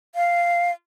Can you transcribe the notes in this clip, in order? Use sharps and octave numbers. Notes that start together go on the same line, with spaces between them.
F5